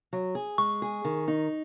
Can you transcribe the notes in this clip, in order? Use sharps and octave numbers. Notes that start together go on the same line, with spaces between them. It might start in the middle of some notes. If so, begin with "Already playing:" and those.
F#3
G#4
G#3 C#6
G#4
D#3
D#4